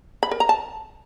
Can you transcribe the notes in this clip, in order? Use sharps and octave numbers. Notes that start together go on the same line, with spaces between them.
B5
A#4
A#5
A5